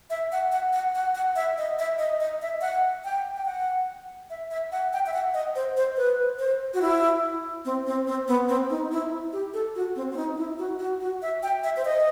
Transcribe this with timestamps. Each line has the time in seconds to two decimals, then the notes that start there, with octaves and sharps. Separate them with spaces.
0.10 E5
0.32 F#5
0.52 F#5
0.73 F#5
0.95 F#5
1.15 F#5
1.36 E5
1.58 D#5
1.79 E5
1.99 D#5
2.20 D#5
2.42 E5
2.61 F#5
3.05 G5
3.36 G5
3.45 F#5
4.30 E5
4.51 E5
4.72 F#5
4.93 G5
5.06 E5
5.14 F#5
5.34 D#5
5.55 C5
5.77 C5
5.97 B4
6.39 C5
6.74 F#4
6.82 E4
7.65 C4
7.87 C4
8.07 C4
8.28 B3
8.48 C4
8.70 D#4
8.92 E4
9.33 G4
9.54 A4
9.75 F#4
9.96 C4
10.12 C4
10.16 D#4
10.37 E4
10.59 F#4
10.79 F#4
11.01 F#4
11.22 E5
11.43 G5
11.64 E5
11.77 C5
11.85 D#5